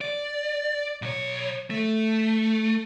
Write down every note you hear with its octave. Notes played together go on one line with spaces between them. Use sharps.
D5
B1 C#5
A3